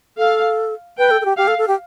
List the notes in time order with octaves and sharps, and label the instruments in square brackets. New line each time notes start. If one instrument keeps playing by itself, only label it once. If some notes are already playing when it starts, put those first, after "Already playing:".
[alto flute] A4 [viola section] F5
[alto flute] B4 [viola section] G5
[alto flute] A4
A4
G4
[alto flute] G4 [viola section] F5
[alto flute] A4
A4
G4